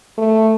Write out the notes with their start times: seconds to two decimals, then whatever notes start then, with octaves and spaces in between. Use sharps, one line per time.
0.18 A3